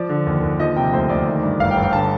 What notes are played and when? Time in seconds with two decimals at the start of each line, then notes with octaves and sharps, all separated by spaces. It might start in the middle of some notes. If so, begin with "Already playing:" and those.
Already playing: F3 D5
0.09 D3
0.26 D#2
0.43 D#2
0.59 F3 D#5
0.76 C3 G5
0.93 D2 C5
1.09 D2 D5
1.27 D#3
1.43 G2
1.59 G1 F5
1.71 G5
1.77 G1
1.83 G5
1.93 D3 A5